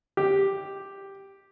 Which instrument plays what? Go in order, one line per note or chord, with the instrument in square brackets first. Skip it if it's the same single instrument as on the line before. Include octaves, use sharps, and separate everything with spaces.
[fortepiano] G4